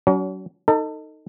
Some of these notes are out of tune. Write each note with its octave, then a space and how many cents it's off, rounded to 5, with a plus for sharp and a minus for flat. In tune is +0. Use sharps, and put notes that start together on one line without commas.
F#3 +25 C#4 +40
D#4 +0 A4 +30